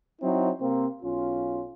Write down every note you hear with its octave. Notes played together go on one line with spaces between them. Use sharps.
F#3 C4 D#4 E4
C3 A#3 C4
B1 C#4 F4